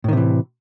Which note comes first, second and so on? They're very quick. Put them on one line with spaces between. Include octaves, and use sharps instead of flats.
A2 D#3 C3 E3